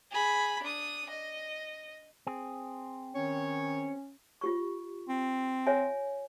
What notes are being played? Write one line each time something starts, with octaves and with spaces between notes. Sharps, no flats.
G#4 B5
D4 D#6
D#5
C4 G#4
D#3 C#4 C#5
F4 G4 C#6
C4
C#5 E5 G#5